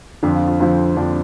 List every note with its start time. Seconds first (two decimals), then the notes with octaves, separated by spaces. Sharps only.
0.23 F2 D3 F3 D4
0.35 F4
0.47 F4
0.60 F2 D3 F3 C4
0.97 F2 D3 F3 D4